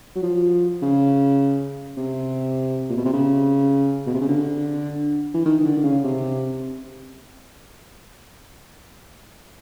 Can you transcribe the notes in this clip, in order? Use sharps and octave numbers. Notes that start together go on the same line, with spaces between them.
F#3
F3
C#3
C3
A#2
B2
C3
C#3
B2
C3
C#3
D3
E3
D#3
D#3
D3
D3
C#3
C3